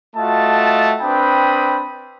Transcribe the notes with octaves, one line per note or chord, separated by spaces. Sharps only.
A3 F4 F#4 D#5 A5
C4 D4 B4 G5 B5 D#6